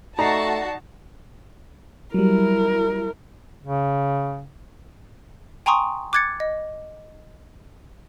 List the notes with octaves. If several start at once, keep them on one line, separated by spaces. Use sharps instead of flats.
A3 D#4 F#4 D5 A5 A#5 A#6 C7
F#3 G3 E4 A#4
C#3
G5 G#5 A#5 C6 C#6 D#6
D6 F#6 G#6 A6 C#7
D#5